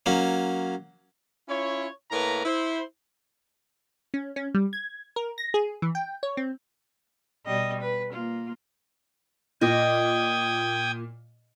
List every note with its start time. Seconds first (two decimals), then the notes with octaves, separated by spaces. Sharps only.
0.06 F#3 A#3 C#4
1.49 C#4 E4 F4 C#5
2.11 A2 A#3 A#4 B4 C#5 A#5
2.45 E4 C5
4.14 C#4
4.36 C#4
4.54 G3
4.73 G#6
5.16 A#4
5.38 A#6
5.54 G#4
5.82 E3
5.95 G5
6.23 C#5
6.37 C4
7.46 B2 G3 D#5
7.81 B4
8.13 A#3 F4
9.61 A#2 D#5 G5 D#6 G#6